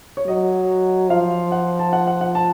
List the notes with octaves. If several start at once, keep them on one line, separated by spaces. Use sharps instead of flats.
C#5
F#3 D#5
F3 F5
F#5
A5
F#5
F#5
F#5
A5